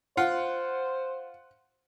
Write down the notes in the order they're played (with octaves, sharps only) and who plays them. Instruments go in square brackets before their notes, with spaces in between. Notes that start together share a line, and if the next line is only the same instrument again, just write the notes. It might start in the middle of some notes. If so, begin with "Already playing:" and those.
[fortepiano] F4 [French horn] C5 [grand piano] F#5